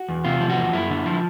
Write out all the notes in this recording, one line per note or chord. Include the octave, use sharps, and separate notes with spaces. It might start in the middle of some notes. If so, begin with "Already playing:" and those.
Already playing: F#4
E2
C3 F4
F3
F#4
E2
F#2 E4
D3
F3